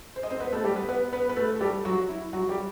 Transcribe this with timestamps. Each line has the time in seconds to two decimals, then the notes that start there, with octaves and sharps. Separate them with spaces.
0.16 C5
0.23 D#5
0.31 C4 C5
0.40 B3 B4
0.53 A3 A4
0.64 G3 G4
0.76 B3 B4
0.89 B3 B4
1.13 B3 B4
1.29 B4
1.36 A3 A4
1.56 A4
1.61 G3 G4
1.85 F#3 F#4
2.09 E4
2.33 F#3 F#4
2.49 G3 G4